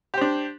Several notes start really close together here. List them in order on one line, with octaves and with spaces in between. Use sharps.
G4 C5 D4